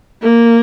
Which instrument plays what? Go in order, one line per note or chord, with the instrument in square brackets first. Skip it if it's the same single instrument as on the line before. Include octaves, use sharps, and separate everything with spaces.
[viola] A#3